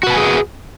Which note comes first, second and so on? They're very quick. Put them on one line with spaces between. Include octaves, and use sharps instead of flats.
F#4 B4 A5 G#5 G#4